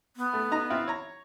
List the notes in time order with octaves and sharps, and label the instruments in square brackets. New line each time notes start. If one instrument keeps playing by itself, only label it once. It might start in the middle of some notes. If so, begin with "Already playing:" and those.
[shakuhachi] B3
[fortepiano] A3
D#4 A#5
C4 E4 F4
C#5 A#5